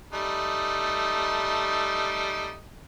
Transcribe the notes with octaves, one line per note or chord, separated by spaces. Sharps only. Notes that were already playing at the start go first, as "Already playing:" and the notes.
G3 A3 D#4